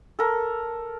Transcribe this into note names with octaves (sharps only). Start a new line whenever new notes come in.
A4 A#4